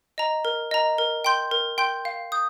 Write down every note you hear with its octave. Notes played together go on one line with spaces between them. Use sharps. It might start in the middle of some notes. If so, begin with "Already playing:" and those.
D#5 A#5
A#4
D#5 A#5
A#4
G5 C6 G6
A#4
G5 C6 G6
F5
D#6 G6